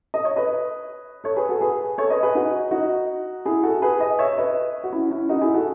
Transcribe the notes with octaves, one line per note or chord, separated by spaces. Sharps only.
D#5
C#5
B4 D#5
A4 C#5
G#4 B4
F#4 A4
G#4 B4
A4 C#5
B4 D#5
G#4 B4
D#4 F#4
D#4 F#4
E4 G#4
F#4 A4
G#4 B4
B4 D#5
C#5 E5
B4 D#5
F#4
C#4 E4
C#4 E4
D#4 F#4
E4 G#4
F#4 A4